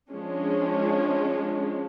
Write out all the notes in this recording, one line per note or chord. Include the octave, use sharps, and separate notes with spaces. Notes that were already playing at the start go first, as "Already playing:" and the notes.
F3 G#3 C#4 D4